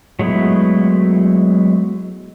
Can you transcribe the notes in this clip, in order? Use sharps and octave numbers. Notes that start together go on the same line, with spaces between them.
F#3 G#3 A3 B3 E4